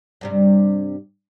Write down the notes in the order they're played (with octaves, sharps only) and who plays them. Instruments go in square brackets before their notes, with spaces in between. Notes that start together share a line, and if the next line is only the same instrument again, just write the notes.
[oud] G2 C3 G3